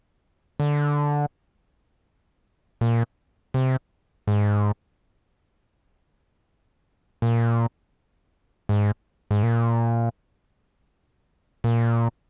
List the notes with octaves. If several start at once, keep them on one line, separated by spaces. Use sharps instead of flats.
D3
A#2
C3
G#2
A#2
G#2
G#2
A#2
A#2